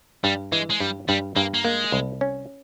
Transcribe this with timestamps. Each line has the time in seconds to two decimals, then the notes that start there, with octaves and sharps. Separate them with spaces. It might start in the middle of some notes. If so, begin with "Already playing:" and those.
0.24 G2 G3
0.52 E3 G#3
0.70 G#3
0.80 G2 G3
1.09 G2 G3
1.36 G2 A#3
1.54 A#3
1.65 G#3 A#3
1.92 C2
2.21 C#4